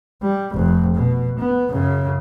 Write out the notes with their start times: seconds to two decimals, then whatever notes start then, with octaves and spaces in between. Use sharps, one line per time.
0.22 G3
0.54 F1 F2
0.94 B2
1.39 B3
1.70 F#2 C#3